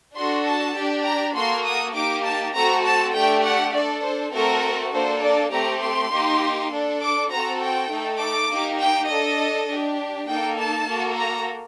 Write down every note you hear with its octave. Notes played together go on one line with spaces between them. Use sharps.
D4 F#4 A4 C6
A5
D4 G4
A#5
A#3 F#4 A4 C6
D#6
A#3 D#4 G4 D6
A5
A3 C4 F#4 A4 A#5
A5
A3 D4 G4 G5
F#5
D4 A4 D5
C5
A3 C4 F#4 A4 A#4
A#3 D4 A4 C5
D5
A3 C4 G4 A#5
C6
A#3 D#4 G4
D4 A4
D6
C4 F#4 A4 A#5
G5
A3 D#4 A4
D6
A#3 D#4 G4
G5
D4 A4 D#5
D4 G4
A#3 D#4 A4 G5
A5
A#3 F#4 A4
A#5